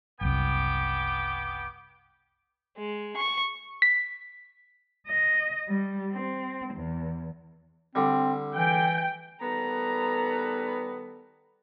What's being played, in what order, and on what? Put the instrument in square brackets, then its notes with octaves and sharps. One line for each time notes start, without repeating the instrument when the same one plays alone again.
[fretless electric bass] F#1 C2 [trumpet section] B3 G5 D6
[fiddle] G#3
C#6
[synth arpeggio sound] B6
[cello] D#5
G3
C4
E2
[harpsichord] D3 G3 [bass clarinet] C4
[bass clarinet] E3 [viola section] G5
[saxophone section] D#3 G3 B3 [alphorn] A4 [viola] A#5